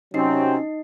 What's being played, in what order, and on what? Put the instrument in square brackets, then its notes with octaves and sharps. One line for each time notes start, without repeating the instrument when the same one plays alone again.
[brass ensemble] C3 F#3 C4 [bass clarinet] C#4 [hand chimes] D#4 D#5 C7